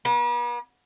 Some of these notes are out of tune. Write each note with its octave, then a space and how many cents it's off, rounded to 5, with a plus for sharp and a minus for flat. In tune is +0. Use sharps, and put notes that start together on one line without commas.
B3 -45